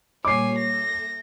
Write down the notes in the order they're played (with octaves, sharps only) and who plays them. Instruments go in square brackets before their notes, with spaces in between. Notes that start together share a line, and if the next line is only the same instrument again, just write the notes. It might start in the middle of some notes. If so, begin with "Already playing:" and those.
[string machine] A#2 G3 A#3 [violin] C#5 G#5 [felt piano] D6 C7
[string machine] A4 E5 G6 [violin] A#6